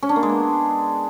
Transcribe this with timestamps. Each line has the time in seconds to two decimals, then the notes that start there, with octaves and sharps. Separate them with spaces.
0.03 C#4
0.09 D4
0.16 A#3
0.23 G#3
0.29 B3